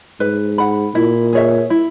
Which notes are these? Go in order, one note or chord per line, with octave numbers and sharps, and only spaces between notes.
G#2 B4
F#5 B5
A#2 E4
G#4 C#5 E5
E4